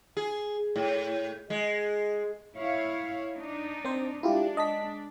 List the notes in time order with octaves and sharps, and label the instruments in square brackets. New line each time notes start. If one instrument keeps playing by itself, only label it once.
[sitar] G#4
A2
G#3
[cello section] E4 C#5 F5
D4 D#4
[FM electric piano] C4 C5
[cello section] G#3 D4 [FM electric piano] E4 F4 G4
[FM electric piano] D#5 A5 B6